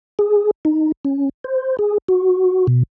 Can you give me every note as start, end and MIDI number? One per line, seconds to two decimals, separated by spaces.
0.19 0.51 68
0.65 0.92 63
1.05 1.29 61
1.44 1.77 72
1.79 1.98 68
2.08 2.67 66
2.67 2.83 47